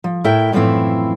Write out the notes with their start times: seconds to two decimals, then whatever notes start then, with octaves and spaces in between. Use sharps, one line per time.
0.04 F3
0.24 A2 E4 A#4 E5 G5
0.52 F#2 A2 E3 F3 C4 E4